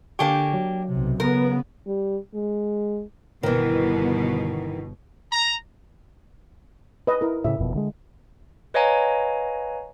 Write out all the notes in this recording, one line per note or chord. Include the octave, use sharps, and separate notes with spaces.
D3 A#3 D4 G4 G#5 C#6
F#3
B1 C3
C#3 B3 A#4
G3
G#3
G1 B2 D#3 E3
A#5
B4 D#5
E4 A#4
A2 C#3 E5
F#1 F2 B2
D3 G3 G#3
B4 C#5 D#5 F5 G#5 A#5